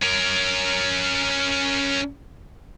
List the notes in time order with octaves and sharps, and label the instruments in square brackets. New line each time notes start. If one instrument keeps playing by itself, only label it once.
[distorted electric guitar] C#4 A#4